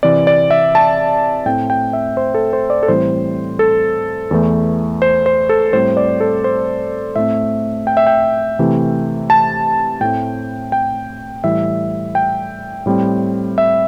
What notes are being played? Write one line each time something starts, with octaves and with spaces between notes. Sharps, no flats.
C3 E3 C4 D5
D5
E5
A5
A2 A3 C4 G5
G5
E5
C5
A4
C5
D5
A4
A2 E3 G3 C4 C5
A4
E2 E3 A3
C5
C5
A4
A2 G3 C4 C5
D5
A4
C5
A2 A3 C4 E5
G5
E5
G5
C3 E3 A3
A5
A2 A3 C4 G5
G5
A2 E3 G3 E5
G5
A2 G3 C4
E5